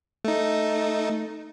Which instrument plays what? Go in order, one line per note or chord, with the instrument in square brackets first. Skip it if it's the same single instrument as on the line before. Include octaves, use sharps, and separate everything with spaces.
[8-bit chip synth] A3 D#4